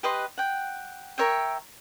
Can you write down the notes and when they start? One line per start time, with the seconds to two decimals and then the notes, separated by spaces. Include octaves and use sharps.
0.03 G4 B4 D#5 C6
0.38 F#5 G5
1.18 A#4 C#5 E5 G5